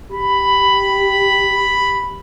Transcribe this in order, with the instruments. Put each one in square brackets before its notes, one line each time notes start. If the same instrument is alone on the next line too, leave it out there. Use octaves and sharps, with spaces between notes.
[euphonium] G4 [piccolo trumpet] B5